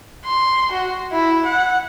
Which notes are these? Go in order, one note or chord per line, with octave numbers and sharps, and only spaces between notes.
C6
F#4
E4
F#5